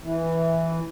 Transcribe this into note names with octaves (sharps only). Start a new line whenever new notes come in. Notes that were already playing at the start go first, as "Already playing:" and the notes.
E3